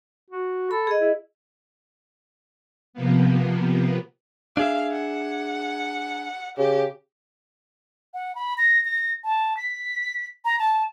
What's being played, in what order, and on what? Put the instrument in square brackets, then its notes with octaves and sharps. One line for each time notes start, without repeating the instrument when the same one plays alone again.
[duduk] F#4
[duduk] A4 [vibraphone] B5
[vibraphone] G#4 D#5
[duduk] E4
[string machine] C3 F3 A#3 B3
[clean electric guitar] D4 G#4 E5 [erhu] F5
[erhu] F#5
[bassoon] C#3 [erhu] G4
[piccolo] F#5
B5
A#6
A#6
A5
B6
A#5
A5